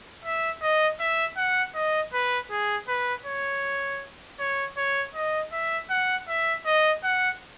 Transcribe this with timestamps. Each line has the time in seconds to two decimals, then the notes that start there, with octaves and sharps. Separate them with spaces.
0.24 E5
0.62 D#5
1.00 E5
1.37 F#5
1.75 D#5
2.13 B4
2.50 G#4
2.88 B4
3.26 C#5
4.39 C#5
4.77 C#5
5.15 D#5
5.52 E5
5.90 F#5
6.28 E5
6.66 D#5
7.04 F#5